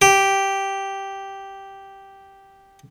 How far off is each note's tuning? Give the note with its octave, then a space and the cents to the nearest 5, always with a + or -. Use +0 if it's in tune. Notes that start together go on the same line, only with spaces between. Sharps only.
G4 -5